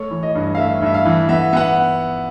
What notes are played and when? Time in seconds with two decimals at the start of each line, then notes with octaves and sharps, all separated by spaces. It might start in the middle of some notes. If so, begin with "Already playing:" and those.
Already playing: A3 C#5
0.11 E3
0.23 D#5
0.35 G2
0.55 F5
0.58 A3 E5
0.82 G2 E5
0.94 F5
1.05 E3
1.29 B3 E5
1.53 B3 F#5